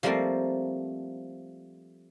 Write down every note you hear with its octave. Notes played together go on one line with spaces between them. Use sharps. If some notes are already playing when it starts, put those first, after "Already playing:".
F3 G3 A3 A#3 C4